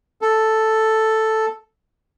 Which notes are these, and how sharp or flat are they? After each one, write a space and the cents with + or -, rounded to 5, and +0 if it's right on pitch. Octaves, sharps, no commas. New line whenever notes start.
A4 +0